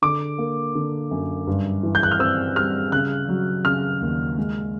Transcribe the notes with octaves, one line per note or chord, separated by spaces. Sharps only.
D3 D6
A#3
D3
F#2
G2
E3
G6
F#6
F6
C4 E6
G3 F6
C#3 F#6
F#3
C#3 F6
D#2
G#3